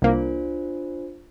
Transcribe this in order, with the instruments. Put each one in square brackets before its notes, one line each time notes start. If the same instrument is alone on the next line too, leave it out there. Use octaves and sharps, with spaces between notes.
[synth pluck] C2 A#3 [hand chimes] D4 F4 C5